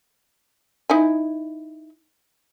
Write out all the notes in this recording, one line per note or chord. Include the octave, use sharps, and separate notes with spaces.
D#4 E4 G#5